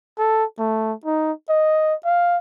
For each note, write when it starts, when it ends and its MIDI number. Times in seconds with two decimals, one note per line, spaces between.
0.18 0.44 69
0.59 0.93 57
1.05 1.32 63
1.49 1.94 75
2.05 2.38 77